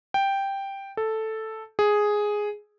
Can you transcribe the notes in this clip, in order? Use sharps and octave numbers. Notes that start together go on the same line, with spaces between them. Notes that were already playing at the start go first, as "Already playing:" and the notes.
G5
A4
G#4